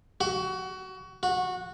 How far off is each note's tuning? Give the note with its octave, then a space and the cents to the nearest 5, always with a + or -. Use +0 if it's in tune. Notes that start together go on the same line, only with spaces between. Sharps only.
F#4 +25
F#4 -15